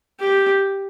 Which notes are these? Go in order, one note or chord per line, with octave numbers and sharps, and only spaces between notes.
G4